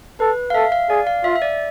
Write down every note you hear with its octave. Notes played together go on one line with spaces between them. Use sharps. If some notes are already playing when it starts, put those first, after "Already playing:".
A4 B4
F5
A4 E5
F5
G#4 D5
F5
F4 E5
E5
D5